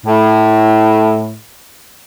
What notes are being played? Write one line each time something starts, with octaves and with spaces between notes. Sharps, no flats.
A2